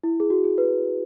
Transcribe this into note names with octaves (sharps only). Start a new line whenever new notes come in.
E4
G#4
F#4
G#4
B4